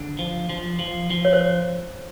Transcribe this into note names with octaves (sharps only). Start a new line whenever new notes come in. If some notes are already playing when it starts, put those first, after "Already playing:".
Already playing: D3
F3
F3
F3
F3
C#5
C5